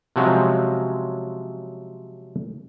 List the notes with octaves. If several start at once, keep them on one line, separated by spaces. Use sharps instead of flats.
C3 F3 F#3 G#3 C4 C#4